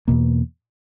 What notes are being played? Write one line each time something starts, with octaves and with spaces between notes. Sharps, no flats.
E2 B2 A#3